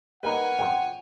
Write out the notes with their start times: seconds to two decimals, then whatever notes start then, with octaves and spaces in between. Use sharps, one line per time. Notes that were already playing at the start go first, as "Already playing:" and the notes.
0.23 G3 A#3 D#4 A#4 B4 C#5 F#5 G#5
0.59 G#1 F#2 F4 G5